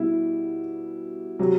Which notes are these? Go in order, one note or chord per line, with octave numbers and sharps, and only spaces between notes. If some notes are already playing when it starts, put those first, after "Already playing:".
Already playing: B2 G3 E4
C3 F#3